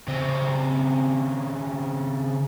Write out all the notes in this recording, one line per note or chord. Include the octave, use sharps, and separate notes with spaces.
C#3 C4